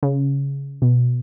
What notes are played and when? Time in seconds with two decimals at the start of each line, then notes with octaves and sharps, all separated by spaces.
0.03 C#3
0.82 B2